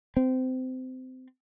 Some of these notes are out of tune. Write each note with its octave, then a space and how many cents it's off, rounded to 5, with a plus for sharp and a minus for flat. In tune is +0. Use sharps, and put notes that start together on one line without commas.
C4 -25